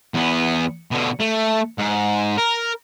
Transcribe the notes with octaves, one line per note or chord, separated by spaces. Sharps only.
E2 B3
B2 D3
A3
G#2
A#4